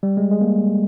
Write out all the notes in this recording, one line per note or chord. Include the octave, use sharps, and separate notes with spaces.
G3
G#3
G#3
A#3